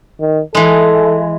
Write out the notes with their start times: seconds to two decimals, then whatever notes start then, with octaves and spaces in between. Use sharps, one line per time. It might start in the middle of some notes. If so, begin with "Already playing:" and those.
0.20 D#3
0.55 E3 G#3 A4